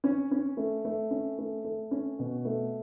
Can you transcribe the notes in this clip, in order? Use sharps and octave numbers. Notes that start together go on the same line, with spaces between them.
C#4
C#4
A3
A3
C#4
A3
A3
C#4
B2
A3